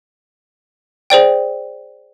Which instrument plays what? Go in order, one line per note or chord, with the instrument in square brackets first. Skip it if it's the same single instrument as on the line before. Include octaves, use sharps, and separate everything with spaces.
[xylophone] G#4 C5 D5 G5